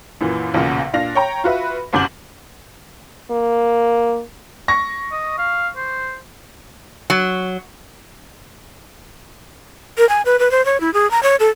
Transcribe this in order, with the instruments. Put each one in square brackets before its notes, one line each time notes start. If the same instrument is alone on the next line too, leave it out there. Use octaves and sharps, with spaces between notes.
[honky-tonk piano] F#2 A#2 E3
B1 E2 A#2 C#3
A#2 D4 F5 A#6 F7
C#5 G5 A#5
F4 F#4 B4 E5
G1 C2 F#2 D6 G6 F#7
[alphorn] A#3
[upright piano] C#6 A#6
[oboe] D#5
F5
C5
[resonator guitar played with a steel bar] F#3
[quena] A#4
G#5
B4
B4
C5
C#5
E4
G#4
A#5
C#5
A4